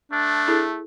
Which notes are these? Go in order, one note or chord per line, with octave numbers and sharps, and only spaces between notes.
A3 D4
E4 G#4 A4